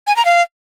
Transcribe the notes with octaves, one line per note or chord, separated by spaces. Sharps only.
G#5
A#5
F5